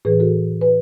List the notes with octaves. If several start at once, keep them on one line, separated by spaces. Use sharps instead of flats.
A2 E3 G#4 B4
F#4 A4
B4